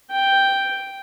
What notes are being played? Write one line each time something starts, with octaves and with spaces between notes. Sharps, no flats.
G5